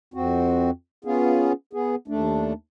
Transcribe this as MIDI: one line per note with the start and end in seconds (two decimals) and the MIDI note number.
0.14 0.71 41
0.14 0.71 60
0.14 0.71 66
1.05 1.53 59
1.05 1.53 61
1.05 1.53 65
1.05 1.53 68
1.73 1.95 59
1.73 1.95 68
2.08 2.53 39
2.08 2.53 57
2.08 2.53 62